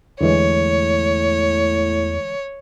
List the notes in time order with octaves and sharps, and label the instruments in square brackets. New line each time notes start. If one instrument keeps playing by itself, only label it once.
[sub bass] E2 [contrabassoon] A2 [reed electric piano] D3 E3 G#3 [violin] C#5